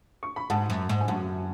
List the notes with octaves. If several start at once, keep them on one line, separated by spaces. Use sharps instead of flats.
C#6
B5
G#2 F#5 A5
F#2
G#2
G#5
F#2 F#5 A5